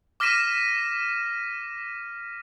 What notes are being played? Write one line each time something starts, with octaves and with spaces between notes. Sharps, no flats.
D6 F6 A#6 B6 D#7 E7